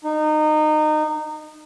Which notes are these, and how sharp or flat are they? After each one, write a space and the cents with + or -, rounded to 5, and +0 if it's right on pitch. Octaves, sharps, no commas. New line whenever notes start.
D#4 -25